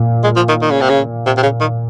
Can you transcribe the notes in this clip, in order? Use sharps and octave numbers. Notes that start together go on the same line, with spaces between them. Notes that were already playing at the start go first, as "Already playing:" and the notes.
Already playing: A#2
G#3
F3
D#3
D#3
C#3
C3
C#3
C3
C3
C#3
D#3